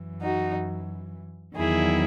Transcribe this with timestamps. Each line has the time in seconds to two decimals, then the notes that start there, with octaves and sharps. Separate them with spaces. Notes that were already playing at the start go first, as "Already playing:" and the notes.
Already playing: F#2 E3
0.21 D#4 F#4
1.56 E2 D#3 F#3 E4 G#4